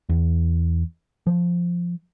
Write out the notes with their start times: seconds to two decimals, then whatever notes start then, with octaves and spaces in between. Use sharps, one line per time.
0.09 E2
1.27 F3